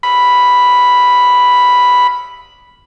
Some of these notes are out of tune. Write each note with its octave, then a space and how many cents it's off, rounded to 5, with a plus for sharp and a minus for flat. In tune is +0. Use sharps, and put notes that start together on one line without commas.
B5 +0